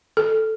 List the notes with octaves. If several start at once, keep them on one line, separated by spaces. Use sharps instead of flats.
A4